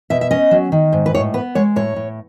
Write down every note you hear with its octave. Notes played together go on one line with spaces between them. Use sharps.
B2 E5
E5
C#4 D#5
F#3
D#3
G#2
B4
A2 C#5
B3 B4
G#3 C#5
A2 C#5
A2